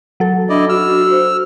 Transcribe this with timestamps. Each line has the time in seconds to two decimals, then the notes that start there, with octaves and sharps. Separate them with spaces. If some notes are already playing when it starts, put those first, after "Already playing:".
0.20 F#3 A4
0.49 D4 E4 D5 D#5
0.69 F#4 E6 F6
1.11 C5